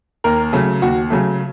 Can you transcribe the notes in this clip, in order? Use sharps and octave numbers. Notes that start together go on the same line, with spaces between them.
D#2 A#4
C#3 F#3 A3
D#2 F#4
C#3 F#3 A3